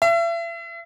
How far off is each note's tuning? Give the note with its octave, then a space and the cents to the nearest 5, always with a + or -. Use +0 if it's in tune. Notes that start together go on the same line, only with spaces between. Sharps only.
E5 +40